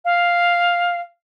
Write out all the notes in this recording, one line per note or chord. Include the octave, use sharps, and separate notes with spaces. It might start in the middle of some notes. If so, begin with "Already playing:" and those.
F5